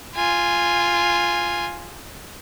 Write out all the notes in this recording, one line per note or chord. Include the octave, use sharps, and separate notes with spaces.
F4 G#5